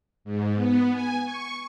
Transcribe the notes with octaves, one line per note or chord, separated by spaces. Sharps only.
G#2
B3
G#5
C#6